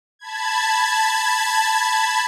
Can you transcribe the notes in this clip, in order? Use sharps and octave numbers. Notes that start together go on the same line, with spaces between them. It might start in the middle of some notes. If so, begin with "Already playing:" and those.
A5 B5 G#6